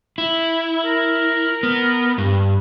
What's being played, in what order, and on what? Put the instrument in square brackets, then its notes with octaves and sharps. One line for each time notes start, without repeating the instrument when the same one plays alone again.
[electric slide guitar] E4
[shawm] A#4
[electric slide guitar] B3
G2